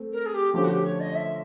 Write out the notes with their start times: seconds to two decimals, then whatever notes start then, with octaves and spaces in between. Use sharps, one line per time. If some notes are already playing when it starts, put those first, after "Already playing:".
Already playing: A3 C4
0.12 A#4
0.26 G#4
0.34 G4
0.54 D3 F3 A3 C#4 G4
0.64 F#4
0.69 G4
0.84 C#5
1.00 D#5
1.15 E5